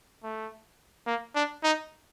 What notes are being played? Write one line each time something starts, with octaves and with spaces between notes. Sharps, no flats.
A3
A#3
D4
D#4